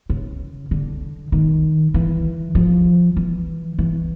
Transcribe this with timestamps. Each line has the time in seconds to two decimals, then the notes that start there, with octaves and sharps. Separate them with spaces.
0.09 C#3
0.71 D3
1.32 D#3
1.94 E3
2.55 F3
3.17 E3
3.79 E3